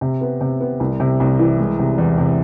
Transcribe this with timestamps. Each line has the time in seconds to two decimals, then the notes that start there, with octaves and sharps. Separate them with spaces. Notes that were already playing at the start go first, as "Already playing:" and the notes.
0.01 C3
0.21 B3
0.41 C3
0.61 B3
0.80 C2
1.00 C3
1.20 C2
1.39 E3
1.59 G#3
1.79 C3
1.98 E2
2.18 C3